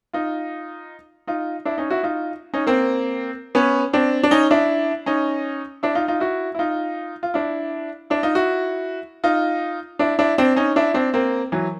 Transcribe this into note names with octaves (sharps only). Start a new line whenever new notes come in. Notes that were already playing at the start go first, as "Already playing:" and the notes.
D#4 F4
D#4 F4
D4 E4
C#4 D#4
E4 F#4
D#4 F4
C#4 D#4
A#3 C4
B3 C#4
C4 D4
D4
C#4 D#4
D4 E4
C#4 D#4
D4 E4
D#4 F4
D#4 F4
E4 F#4
E4
D#4 F4
F4
D4 E4
D4 E4
D#4 F4
E4 F#4
D#4 F4
D4 E4
D4 E4
C4 D4
C#4 D#4
D4 E4
C4 D4
A#3 C4
E3 F#3